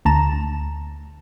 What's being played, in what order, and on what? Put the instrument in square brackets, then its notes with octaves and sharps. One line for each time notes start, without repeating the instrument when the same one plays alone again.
[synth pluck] D2 A5 A#5 E7